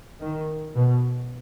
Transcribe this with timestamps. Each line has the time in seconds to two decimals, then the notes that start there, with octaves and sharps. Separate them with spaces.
0.21 D#3
0.75 B2